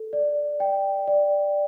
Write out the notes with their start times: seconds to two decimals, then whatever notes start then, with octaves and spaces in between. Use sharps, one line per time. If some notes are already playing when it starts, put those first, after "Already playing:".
Already playing: A4
0.13 D5
0.60 G5
1.08 D5